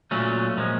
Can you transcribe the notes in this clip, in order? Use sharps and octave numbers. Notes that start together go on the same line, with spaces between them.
A#2 F#3 A3 C#4
A#2 F3 G#3